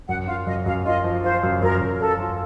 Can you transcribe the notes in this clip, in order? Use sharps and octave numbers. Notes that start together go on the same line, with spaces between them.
F#2 F#5
F4 F5
F#2 D#5
F#2 F5
F4 D#5
F3
F4 C5
F#2
F#2 A#4
F#2
F#2 A4
F4